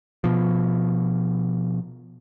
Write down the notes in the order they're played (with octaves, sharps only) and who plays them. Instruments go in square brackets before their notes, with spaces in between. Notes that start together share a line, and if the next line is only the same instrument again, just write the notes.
[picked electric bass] B2 F3